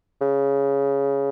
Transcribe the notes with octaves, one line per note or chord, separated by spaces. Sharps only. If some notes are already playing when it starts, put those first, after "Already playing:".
C#3